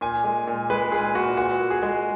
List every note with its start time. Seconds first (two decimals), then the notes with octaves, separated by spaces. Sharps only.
0.01 A#2 G#5
0.24 G#3
0.47 A#2
0.70 G#3 B4
0.91 A#2 G#4
1.15 A#2 F#4
1.37 A#2 F#4
1.59 A#2
1.70 G#4
1.82 G#3